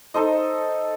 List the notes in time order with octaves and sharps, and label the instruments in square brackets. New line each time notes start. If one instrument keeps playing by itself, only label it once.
[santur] D#4 A4 C5 D#5